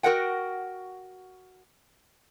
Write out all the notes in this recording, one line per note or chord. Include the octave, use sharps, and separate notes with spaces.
F#4 A#4 D#5 F#5 G5